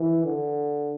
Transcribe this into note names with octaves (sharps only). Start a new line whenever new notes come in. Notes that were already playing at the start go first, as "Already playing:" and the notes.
Already playing: E3
D3